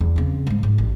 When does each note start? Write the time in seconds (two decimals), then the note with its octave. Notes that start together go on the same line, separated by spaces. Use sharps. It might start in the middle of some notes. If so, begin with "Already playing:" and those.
0.01 E2
0.16 C#3 C4
0.47 G#2 G#3
0.63 G#2
0.78 A1